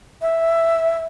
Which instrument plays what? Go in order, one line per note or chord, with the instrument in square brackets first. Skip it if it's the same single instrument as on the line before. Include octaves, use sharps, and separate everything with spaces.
[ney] E5